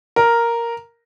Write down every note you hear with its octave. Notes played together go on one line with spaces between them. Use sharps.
A#4